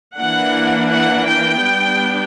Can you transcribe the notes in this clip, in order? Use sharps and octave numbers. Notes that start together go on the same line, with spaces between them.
E3 A#3 D4 F#5
F#5
G5
G3 B3 D4